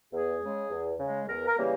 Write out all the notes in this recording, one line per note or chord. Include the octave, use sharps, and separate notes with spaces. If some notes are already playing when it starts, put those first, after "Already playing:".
E2 G#4
C#3 G#3
E2
C#3 G#3
E2 A#4
A#4
C#3 E3 G3 A#3